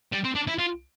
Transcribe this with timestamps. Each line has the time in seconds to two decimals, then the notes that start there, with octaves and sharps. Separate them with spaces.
0.13 G3
0.25 C4
0.35 D4
0.47 E4
0.58 F4